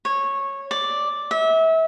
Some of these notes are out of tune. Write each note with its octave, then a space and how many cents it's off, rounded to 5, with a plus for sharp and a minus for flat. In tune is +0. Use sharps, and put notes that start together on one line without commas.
C#5 -15
D5 +0
E5 -30